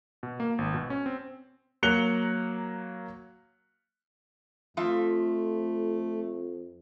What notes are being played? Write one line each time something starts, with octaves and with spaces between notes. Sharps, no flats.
B2
A#3
G#1
B2
C#4
C4
F#3 A#3 F#6 C#7 F7 G7
F2 F3 A3 F4 E5